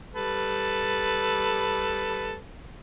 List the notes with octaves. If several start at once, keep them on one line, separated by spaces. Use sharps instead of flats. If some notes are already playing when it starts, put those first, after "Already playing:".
G3 A4 B4